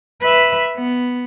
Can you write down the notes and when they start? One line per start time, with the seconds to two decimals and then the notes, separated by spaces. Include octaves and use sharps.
0.22 B4 E5
0.77 B3